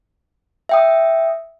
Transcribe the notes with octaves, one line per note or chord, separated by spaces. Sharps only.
E5 G5 D#6